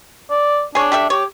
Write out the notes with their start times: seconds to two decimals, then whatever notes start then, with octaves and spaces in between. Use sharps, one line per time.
0.30 D5
0.75 D4 G#4 C#5
0.92 G4 A4 E5
1.10 G4 C#5